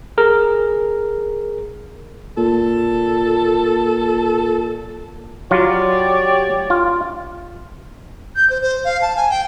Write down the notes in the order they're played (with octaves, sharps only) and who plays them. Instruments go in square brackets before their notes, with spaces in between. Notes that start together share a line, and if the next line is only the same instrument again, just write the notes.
[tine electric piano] G#4 A#4
[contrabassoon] A#2 [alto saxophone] A4
[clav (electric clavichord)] F#3 F4 [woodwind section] G4 C#5 D5
[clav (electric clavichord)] F4
[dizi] G6
C5
C5
F5
A5
G#5
G5